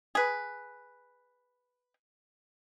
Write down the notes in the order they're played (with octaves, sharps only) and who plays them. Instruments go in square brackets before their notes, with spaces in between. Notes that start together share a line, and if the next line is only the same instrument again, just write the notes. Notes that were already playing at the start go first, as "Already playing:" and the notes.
[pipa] G#4 B4